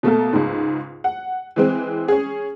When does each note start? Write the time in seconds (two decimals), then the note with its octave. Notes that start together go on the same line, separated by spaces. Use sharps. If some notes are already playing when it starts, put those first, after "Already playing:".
0.03 B2 A3 A#3 A4
0.33 C#2 G#2
1.04 F#5
1.56 E3 G#3 C4
2.08 C#4 G#4